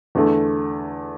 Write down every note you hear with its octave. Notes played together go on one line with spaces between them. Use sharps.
E2 D3 A3